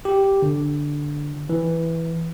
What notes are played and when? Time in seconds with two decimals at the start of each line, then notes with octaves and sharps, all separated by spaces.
0.05 G4
0.42 D3
1.50 E3